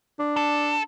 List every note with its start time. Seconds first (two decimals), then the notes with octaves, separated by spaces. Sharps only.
0.19 D4
0.37 A4